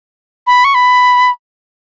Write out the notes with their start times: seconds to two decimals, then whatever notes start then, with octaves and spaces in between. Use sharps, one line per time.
0.47 B5
0.65 C#6
0.75 B5